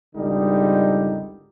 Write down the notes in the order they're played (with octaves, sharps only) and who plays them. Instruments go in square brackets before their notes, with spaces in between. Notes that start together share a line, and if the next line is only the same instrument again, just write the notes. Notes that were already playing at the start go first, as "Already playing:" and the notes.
[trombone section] G#1 C#2 D3 G3 D#4